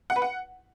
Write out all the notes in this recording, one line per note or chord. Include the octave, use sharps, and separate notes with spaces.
F#5
B4
F#5